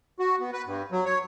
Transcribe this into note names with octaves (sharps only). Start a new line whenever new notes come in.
F#4
B3
B4
G2
F#3
C#5